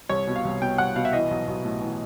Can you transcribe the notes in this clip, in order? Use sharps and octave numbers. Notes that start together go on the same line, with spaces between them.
C2 C#5
B2
F5
C2
B2 G5
C2 F#5
B2 F5
E5
E3 D#5
B1
B1
A2
E3